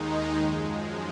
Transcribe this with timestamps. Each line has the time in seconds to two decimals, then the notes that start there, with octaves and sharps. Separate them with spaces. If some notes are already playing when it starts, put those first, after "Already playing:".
Already playing: D#2 D#3 G#3 D#4
0.36 F#2 F3 G#3